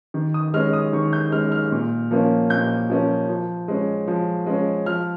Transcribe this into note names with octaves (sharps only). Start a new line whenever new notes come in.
D#3
D#6
G#3 C#4 F6
D#6
D#3 C#6
G6
G#3 C#4 F6
F6
A#2
F3 A#3 C#4
A#2 G6
F3 A#3 C#4
F3
G#3 C#4
F3
G#3 C#4
F3 F6